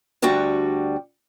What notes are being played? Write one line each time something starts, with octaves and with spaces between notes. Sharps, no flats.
D2 G3 D4 F#4 G5